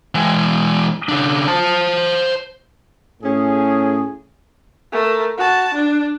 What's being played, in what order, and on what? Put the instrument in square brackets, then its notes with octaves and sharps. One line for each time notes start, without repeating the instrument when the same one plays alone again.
[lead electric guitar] E3 G#3
C#3 D4
C5 A5
[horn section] A2 C#4 G#4
[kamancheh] A3 A#4
F#4 A5
D4